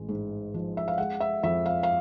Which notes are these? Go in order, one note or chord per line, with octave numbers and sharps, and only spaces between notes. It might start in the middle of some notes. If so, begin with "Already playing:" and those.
Already playing: A1 G#3
G#2
F3
E5
F5
G#3 F#5
E5
F2 E5
F5
F5